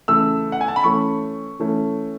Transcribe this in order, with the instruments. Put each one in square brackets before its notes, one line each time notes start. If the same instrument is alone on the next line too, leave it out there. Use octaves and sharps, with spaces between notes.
[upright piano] C#3 E3 A3 E6
F#5
G#5
A5
B5
E3 A3 C#4 C#6
E3 A3 C#4